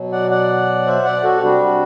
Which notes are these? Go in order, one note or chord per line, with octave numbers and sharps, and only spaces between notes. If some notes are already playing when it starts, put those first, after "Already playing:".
Already playing: B2 F#3
D5 F#5
D5 F#5
C5 E5
D5 F#5
F#4 A4
G4
C3 G3 D4 F#4